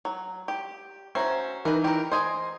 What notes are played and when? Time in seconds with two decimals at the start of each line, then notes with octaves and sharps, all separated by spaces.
0.05 F#3
0.48 G4
1.15 C#4 F#4 C5 E5 A#5
1.65 E3 D#4 E4 A#4 B4
1.84 G4 A#4
2.12 C5 D#5 G#5 A#5 C6 D#6